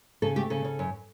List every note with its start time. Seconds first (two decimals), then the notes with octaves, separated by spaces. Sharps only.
0.22 C#3 A4
0.36 A3 G4
0.50 C#3 A4
0.65 C#3
0.79 F#2